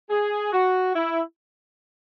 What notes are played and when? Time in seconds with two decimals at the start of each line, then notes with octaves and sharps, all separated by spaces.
0.10 G#4
0.52 F#4
0.95 E4